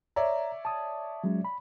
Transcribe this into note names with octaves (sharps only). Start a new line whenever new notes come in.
C#5 D5 E5 A#5
A5 D#6
F#3 G#3 C#4
B5